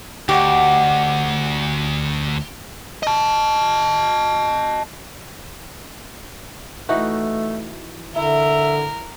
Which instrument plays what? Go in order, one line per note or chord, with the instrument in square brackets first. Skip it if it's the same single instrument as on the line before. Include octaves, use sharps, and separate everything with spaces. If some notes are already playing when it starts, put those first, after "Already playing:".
[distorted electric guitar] D2 [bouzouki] F#4 D#5 F#5 [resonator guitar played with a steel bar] G4
[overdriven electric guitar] D#5 A5
[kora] E3 D#4 F#4 [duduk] A3
[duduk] D3 [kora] E4 [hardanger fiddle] A#4 [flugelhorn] E5